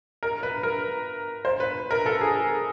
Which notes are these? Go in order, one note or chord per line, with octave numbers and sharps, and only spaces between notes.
A#4
B4
A#4
C5
B4
A#4
A4
G#4